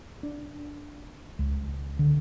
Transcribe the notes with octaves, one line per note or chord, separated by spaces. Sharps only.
D4
C#2
D3